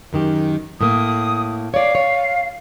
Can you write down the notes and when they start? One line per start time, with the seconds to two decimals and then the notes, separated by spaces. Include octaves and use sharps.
0.13 F#2 D#3 G4
0.81 A2 A#3 D#6
1.74 C#5 D5 F5
1.95 C#5